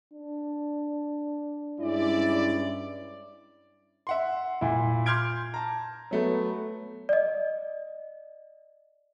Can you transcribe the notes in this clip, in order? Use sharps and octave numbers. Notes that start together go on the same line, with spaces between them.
D4
G2 G3 G#3 C#4 E4 D5
E5 F#5 C6
A#2 E4
C6 D6 F6 G6 G#6 D7
A5 A#5
F#3 A3 B3
D5 D#5